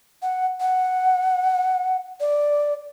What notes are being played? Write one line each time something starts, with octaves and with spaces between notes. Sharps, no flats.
F#5
F#5
D5